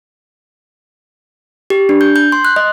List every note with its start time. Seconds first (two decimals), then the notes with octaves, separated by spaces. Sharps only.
1.70 G4
1.89 D4
2.01 G6
2.16 G6
2.32 C6
2.45 F#6
2.56 D#5